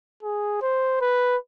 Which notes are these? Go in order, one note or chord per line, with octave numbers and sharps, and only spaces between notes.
G#4
C5
B4